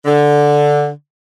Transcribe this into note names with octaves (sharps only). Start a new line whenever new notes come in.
D3